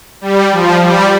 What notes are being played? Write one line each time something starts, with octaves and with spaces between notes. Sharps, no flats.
G3
F3
G3